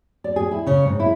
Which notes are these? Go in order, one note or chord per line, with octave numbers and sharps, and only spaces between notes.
D5
G#4
E4
C#3
G#2
E4